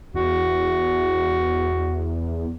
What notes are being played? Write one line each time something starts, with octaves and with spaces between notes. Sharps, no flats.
E2 F#4